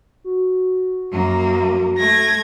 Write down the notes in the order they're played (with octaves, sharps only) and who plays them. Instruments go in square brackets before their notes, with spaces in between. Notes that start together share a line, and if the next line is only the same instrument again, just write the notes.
[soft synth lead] F#4
[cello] F#2 A#3
[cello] A3 [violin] G#6 A#6